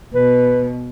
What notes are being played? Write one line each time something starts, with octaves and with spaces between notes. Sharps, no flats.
B2 B4